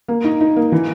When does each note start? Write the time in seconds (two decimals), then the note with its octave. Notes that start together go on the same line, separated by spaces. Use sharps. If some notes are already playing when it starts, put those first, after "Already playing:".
0.08 A#3
0.24 D#4
0.41 D#4
0.56 A#3
0.72 E3